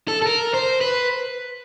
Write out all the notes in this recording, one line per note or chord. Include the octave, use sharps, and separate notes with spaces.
A4
A4
A#4
C5
B4